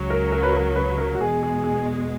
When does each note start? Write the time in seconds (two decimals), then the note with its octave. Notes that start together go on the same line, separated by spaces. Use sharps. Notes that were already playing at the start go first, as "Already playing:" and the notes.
Already playing: C#2 C#3 F#3
0.10 A#4
0.32 A#4
0.43 B4
0.53 A#4
0.76 B4
0.98 A#4
1.15 F#4
1.20 E2 B2 G#3 G#4
1.43 G#4
1.64 G#4